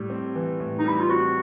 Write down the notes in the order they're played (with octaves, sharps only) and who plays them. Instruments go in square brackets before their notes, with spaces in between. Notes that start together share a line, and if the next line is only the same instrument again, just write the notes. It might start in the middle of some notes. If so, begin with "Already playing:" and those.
Already playing: [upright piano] A2 G3
C4
E3
A2
[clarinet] D#4
[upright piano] G3 [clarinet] E4
[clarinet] F4
[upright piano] C4 [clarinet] F#4